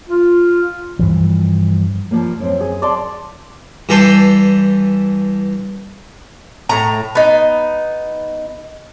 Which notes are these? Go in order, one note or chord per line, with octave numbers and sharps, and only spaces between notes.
F4
G2 E3 F3
F3 G3 A#3
F#2 C4
G#4
D5 A5 C6
G2 E3 A4 G5 C6
A2 A#5
B3 D#4